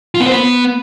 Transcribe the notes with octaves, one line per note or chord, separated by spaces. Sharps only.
F4
B3
C5
B3